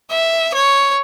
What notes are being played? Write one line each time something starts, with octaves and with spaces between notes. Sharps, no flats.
E5
C#5